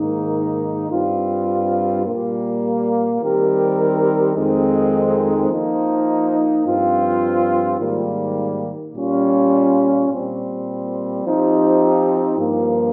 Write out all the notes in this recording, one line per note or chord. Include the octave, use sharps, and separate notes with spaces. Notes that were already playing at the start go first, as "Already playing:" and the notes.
Already playing: G#2 D#3 A#3 D#4
G2 G3 C4 F4
A#2 G3 A#3
D#3 G3 C4 G4 A#4
F2 D#3 G#3 C4 D#4
F3 A#3 D#4
G2 F3 C4 F4
G#2 D#3 G3 A#3
A#2 G3 C#4 F4
A#2 G3 C4
F3 C4 D#4 G4
G2 F3 A#3